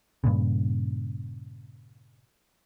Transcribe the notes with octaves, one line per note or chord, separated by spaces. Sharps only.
G2 A#2 C#3